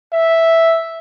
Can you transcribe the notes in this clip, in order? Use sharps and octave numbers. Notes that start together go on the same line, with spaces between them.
E5